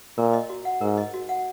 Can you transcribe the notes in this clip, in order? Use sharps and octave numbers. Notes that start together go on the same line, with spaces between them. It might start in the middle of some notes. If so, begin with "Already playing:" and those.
A#2 A#4
D#5
F#4
F#5
G#2 A#4
D#5
F#4
F#5